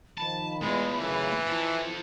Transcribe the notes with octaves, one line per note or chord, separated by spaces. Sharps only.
D#3 F3 A5 B5
E2 G#3 A3 F4
F#2 C#3 E3
F3 E4 A4